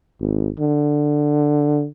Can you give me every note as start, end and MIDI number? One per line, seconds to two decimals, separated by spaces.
0.20 0.48 32
0.59 1.86 50